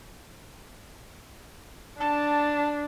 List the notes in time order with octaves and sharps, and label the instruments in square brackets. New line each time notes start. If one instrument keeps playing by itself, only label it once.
[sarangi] D4 [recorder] A5